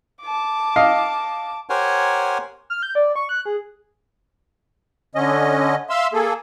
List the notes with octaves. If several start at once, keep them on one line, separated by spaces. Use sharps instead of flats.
A5 D6
D#5 F5
G4 A#4 C5 C#5 F#5 G#5
F6
G6
D5
C#6
F#6
G#4
D3 C#4 D#5
E5 F5 C6 E6
A#3 G#4 A4